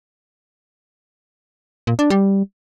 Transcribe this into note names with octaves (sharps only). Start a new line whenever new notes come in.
A#2
D4
G3